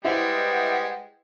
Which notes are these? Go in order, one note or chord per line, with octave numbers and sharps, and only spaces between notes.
G3 G#3 E4 B4 C5 D#5 F#5 G5